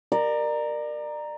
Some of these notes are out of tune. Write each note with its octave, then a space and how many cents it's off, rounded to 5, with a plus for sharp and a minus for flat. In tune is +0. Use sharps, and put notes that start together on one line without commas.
A#4 +0 D5 +30